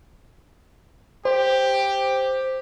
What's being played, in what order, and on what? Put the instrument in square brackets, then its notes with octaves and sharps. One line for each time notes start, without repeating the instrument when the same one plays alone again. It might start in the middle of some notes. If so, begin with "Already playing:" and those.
[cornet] G4 [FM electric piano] C5